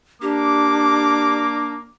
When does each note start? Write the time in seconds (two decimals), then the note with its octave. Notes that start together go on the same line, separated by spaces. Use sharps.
0.22 A#3 D4 G4 D6